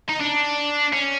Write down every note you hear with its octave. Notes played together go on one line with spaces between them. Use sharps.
D#4
D4
C#4